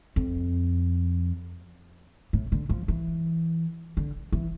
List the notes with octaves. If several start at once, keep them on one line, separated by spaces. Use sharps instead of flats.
F2
A2
D3
F3
E3
D3
E3